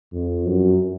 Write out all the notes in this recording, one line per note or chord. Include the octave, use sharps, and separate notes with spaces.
F2
F#2